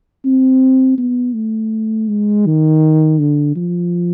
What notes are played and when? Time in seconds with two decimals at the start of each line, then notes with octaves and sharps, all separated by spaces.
0.25 C4
0.98 B3
1.35 A3
2.08 G#3
2.46 D#3
3.19 D3
3.56 F3